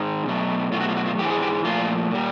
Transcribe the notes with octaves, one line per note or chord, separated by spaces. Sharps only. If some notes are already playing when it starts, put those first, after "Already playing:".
Already playing: G#2 D#3 G#3
B2 F#3 A3
B2 F#3 A3 F4
F#4
F4
F#4
F4
G#2 E3 G#3 G4
G#4
G4
A#2 F3 A3 F4
A#2 G3